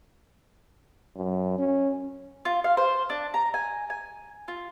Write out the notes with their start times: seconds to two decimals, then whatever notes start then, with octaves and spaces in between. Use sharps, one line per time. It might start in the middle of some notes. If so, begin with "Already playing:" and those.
1.17 F#2
1.59 C#4
2.45 F4
2.64 F5
2.77 C5
3.10 D4
3.34 A#5
3.54 G#5
3.90 G#5
4.48 F4